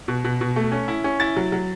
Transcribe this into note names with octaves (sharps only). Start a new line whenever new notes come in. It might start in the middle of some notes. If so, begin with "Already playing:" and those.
B2
B2
B2
A3
C#4
E4
C#4
E4 A6
F#3
F#3